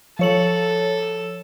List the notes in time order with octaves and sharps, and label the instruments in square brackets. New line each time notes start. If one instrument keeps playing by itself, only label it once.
[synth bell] F3 C#5 F#7 [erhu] A4